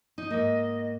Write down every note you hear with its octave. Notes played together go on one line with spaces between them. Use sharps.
D#4
G#2 A#3 D#5